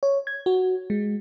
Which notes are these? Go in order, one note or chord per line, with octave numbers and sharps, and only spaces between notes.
C#5
G#6
F#4
G#3